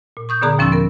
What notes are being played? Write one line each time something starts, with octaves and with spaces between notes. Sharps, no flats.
A#2
C#6 D#6 G6
A#2 D3 B3 G#4 A#5 D#6
D#2 F3 C#4 C6 E6 A6
B3 A#4